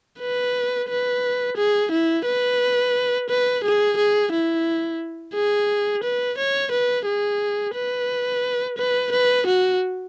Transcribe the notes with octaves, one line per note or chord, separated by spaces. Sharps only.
B4
B4
G#4
E4
B4
B4
G#4
G#4
E4
G#4
B4
C#5
B4
G#4
B4
B4
B4
F#4